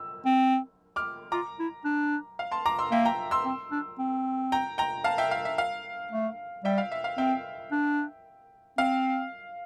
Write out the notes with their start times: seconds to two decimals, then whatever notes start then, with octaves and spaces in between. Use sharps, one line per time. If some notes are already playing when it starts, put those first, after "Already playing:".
Already playing: E6
0.25 C4
0.96 D6 F6
1.32 F4 A#5 D6
1.59 E4
1.85 D4
2.39 F5
2.52 A5 C6
2.66 A#5 D6
2.79 C6 E6
2.92 A#3 E5 G5
3.05 G5 A#5
3.31 C6 E6
3.45 C4
3.72 D4
3.99 C4
4.52 G5 A#5
4.78 G5 A#5
5.04 F5 A5
5.18 E5 G5
5.31 F5
5.45 E5
5.58 F5
6.12 A3
6.64 G3 E5 G5
6.78 F5
6.92 E5
7.04 F5
7.18 C4 E5 G5
7.72 D4
8.78 C4 F5